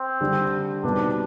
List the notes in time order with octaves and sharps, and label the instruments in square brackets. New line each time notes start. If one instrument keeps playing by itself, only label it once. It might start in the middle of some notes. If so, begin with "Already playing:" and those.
Already playing: [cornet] C4
[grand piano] D3 G3 D4 G4
[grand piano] B2 G3 C4 D#4 B4 [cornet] D4